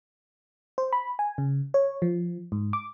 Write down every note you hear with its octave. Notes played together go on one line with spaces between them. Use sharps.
C5
B5
G#5
C#3
C#5
F3
G#2
D6